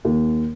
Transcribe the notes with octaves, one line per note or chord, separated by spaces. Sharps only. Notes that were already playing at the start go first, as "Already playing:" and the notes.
D#2